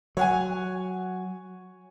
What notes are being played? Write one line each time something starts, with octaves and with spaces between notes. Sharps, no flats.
F#3 C#5 F#5 G#5